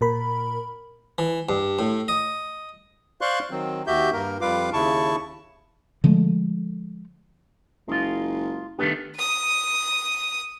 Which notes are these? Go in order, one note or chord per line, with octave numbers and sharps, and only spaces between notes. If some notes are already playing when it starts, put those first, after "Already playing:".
A#2 A#4 B5
E3
G2
A2
D#5
C5 D5 F5 C6 C#6 F#6
D#3 F#3 C4
D#2 F#4 G4 E5 G6
G2 A#3 A#4
F2 G3 F4 B4 F5 D6
D#2 C#3 E4 A5 C#6
D3 F3 G#3 A3
F#1 G#3 F4
G2 D#3 A3 B3
D#6 D#7